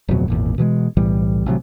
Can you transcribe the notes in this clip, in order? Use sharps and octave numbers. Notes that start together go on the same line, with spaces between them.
D1 F2 B2 F#3
G#1 E2 A#2
B2 E3 F3 G#3
B1 A2 E3 G3
A1 C3 F#3